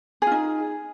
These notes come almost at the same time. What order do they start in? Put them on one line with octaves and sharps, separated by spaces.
G#4 F4 D#4